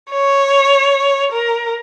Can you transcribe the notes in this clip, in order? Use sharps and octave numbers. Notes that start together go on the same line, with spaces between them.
C#5
A#4